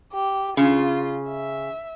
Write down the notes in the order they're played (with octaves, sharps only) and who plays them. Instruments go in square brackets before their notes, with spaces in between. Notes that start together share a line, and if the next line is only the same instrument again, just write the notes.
[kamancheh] G4
[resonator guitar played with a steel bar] C#3 [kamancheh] F4
[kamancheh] E5